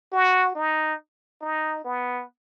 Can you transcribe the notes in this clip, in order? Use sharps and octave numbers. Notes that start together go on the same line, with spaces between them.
F#4
D#4
D#4
B3